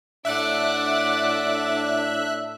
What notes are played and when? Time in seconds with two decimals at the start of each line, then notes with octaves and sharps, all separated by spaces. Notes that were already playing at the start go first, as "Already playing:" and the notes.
0.25 A2 D4 D5 E5 F#5 F#6